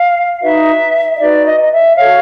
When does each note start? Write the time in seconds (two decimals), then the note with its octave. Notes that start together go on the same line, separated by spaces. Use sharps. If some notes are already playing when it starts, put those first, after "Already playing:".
Already playing: F5
0.42 D#4 F#4 B4 E5
1.15 D#5
1.20 D#4 F#4 B4 D5
1.46 D#5
1.62 D#5
1.72 E5
1.98 F#4 A4 C#5 F5